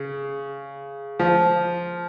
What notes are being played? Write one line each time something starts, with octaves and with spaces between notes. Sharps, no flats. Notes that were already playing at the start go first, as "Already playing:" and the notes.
Already playing: C#3
F3